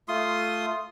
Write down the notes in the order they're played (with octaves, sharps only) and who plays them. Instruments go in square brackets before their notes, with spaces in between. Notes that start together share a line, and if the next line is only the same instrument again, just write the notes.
[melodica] A3 F4 C6 D#6